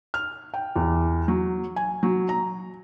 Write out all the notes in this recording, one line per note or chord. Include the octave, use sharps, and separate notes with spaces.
F6
G5
E2
F#3
G#5
F#3
A#5